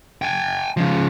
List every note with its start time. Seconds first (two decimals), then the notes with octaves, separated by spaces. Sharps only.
0.22 G5 G#5
0.77 C#3 F3